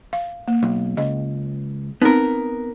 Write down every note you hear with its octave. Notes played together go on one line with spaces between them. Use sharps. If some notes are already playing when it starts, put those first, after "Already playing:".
F5
A#3
B1
C#2 D#5
B3 C4 D#4 A#4